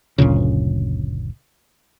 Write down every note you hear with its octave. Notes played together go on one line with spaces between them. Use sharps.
F#1 D2 A#2 C#3